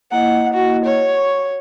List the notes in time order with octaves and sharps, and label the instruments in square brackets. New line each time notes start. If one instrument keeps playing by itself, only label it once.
[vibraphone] A#3 E4 D#5 [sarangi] F#5
[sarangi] F#4
C#5
[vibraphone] C#6